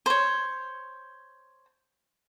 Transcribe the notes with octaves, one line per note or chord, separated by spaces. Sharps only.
C5 C#5